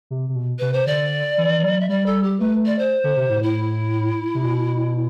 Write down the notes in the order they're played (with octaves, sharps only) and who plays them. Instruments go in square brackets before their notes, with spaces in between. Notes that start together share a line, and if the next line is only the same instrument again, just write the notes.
[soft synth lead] C3
C3
B2
[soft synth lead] C3 [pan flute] B4
[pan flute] C5
[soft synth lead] D3 [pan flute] D5
[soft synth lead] E3
E3
F#3
[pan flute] E5
[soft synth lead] G3 [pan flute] D5
[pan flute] A4
G4
[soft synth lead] A3 [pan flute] B4
[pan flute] D5
C5
[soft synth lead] D3
C3
A2
[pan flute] E4
[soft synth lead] C3
B2